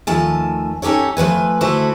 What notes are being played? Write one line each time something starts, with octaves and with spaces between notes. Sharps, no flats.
D#2 F3 A3 G#5 A5
C#4 D#4 G4 A4 C#5
F3 A3 B4 G#5
D3 A3 E4 F#4 A4 C5